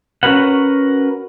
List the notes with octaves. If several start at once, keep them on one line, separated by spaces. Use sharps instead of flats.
C#4 F#4 A#4 B4 F#5